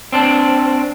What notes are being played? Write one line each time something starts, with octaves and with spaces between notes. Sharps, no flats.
C4 D4